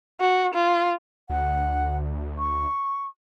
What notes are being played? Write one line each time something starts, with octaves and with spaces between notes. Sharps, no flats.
F#4
F4
D2 F#5
C#6